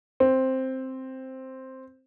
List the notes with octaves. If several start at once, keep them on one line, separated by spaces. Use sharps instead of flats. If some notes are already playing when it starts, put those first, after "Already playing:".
C4